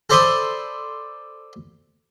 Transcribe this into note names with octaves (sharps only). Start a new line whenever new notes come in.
A4 C5 D5 B5 C6 D#6